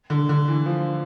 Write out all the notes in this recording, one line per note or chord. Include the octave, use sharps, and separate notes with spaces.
D3
D3
E3
F3